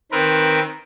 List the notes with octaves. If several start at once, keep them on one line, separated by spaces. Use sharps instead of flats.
D#3 C4 A#4 B4